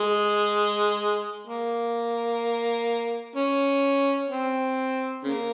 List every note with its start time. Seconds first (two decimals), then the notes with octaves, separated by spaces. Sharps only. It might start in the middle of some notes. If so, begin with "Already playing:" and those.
Already playing: G#3
1.47 A#3
3.36 C#4
4.29 C4
5.24 C#3 A#3